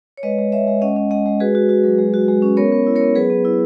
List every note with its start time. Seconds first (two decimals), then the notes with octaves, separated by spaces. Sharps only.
0.17 C#5
0.23 G#3 B4 D#5
0.38 G#3
0.52 G#3 C#5 E5
0.67 G#3
0.82 C#4 D#5 F#5
0.96 C#4
1.11 G#3 D#5 F#5
1.26 G#3
1.40 F#4 G#4 B4
1.55 F#4
1.69 F#4
1.84 F#3
1.99 G#3
2.14 F#4
2.28 G#3
2.42 C#4
2.57 B3 A#4 C#5
2.72 B3
2.87 E4
2.96 A#4 C#5
3.01 B3
3.15 F#3 G#4 B4
3.30 B3
3.45 E4